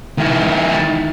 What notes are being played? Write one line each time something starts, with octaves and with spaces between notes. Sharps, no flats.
D#3 E4